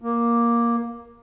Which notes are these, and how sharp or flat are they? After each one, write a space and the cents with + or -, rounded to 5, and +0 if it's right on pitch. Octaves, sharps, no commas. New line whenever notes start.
A#3 +10